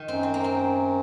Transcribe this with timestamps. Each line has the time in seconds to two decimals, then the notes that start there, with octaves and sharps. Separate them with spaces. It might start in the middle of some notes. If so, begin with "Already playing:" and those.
Already playing: D#3
0.08 F#2 C4
0.23 C4
0.34 A#3
0.44 C4